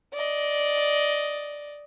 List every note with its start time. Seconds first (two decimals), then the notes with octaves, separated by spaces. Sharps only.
0.14 D5 D#5